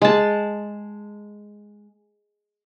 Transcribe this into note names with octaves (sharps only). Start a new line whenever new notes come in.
G#3 A5